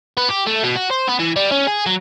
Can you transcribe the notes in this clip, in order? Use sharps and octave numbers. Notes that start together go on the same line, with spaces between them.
B3
G4
A3
B2
F#4
C5
B3
E3
G3
C#4
G#4
F#3